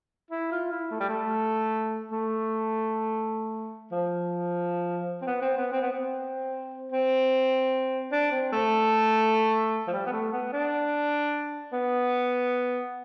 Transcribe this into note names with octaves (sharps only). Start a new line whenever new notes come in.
E4
F4
E4
A3
G3
A3
A3
F3
C4
B3
C4
B3
C4
B3
C4
C4
D4
C4
A3
F3
G3
B3
A3
B3
D4
B3